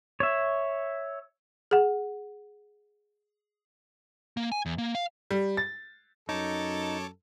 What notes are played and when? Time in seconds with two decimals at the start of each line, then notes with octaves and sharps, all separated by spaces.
0.20 C#5 E5
1.71 G#4 F#5
4.37 A#3
4.52 G#5
4.66 E2
4.78 A#3
4.95 F5
5.31 G3
5.57 A6
6.29 F#2 D#4 A4 C#5 A5 D6